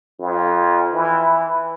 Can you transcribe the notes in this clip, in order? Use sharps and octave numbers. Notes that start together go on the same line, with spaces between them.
F2
E3